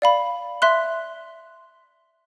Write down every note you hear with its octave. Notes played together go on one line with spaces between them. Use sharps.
D5 F5 B5
E5 C6 F#6